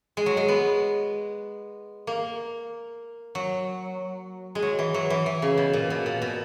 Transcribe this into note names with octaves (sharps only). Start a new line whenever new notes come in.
G#3
F#3
G#3
B3
A#3
F#3
G#3
F#3
E3
F#3
E3
E3
C#3
B2
A#2
B2
A#2
B2